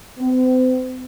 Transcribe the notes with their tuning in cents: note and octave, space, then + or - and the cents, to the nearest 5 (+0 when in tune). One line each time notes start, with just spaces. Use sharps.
C4 -40